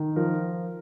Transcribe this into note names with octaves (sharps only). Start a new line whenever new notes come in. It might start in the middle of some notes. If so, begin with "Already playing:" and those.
Already playing: D#3
F3 A#4